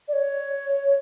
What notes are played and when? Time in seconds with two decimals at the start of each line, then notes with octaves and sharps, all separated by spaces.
0.08 D5
0.13 C#5